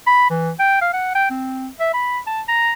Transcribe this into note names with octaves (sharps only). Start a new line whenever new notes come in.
B5
E3
G5
F5
F#5
G5
C4
E5
B5
A5
A#5